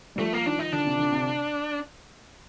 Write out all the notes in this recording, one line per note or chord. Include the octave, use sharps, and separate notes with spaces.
G3
F3 A3
A#3
D#3 D4
D#4
D3 D4
C3
D3
C3